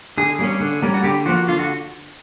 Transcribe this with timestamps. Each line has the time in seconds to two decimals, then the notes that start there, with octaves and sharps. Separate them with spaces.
0.18 D3 G#4
0.39 G3 A#3 C#4
0.60 D3
0.82 G3 A#3 C#4
0.94 F#4
1.04 D3 G4
1.26 F3 A#3 F#4
1.48 D3 F4
1.59 F#4